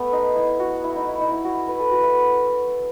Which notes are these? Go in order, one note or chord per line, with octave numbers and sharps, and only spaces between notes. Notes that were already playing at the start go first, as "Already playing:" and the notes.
Already playing: A3 B3
D#4
E4
F#4
E4
D#4
E4
D#4
E4
F#4
B4
A4
F#4
E4